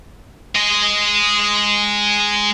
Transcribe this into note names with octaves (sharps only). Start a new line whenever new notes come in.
G#3 D#5